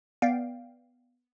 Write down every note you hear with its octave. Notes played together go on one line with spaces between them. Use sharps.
B3 D5 F5 G5